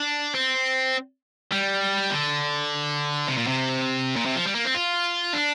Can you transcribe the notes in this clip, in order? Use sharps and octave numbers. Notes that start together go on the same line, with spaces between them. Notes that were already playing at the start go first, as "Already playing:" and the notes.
Already playing: D4
C4
G3
D3
C3
A#2
C3
A#2
C3
F3
G3
A#3
C4
F4
D4